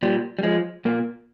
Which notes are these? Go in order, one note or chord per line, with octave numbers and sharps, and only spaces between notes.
A#2 G3
G3
F3 G#3
A#2 A#3